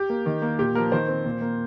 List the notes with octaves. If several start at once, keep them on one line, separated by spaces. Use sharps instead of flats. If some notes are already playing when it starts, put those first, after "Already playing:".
Already playing: G4
A#3
D#3
A#3
A#2 G4
F3 A#3 A#4
D#3 C5
C4
A#2
A#3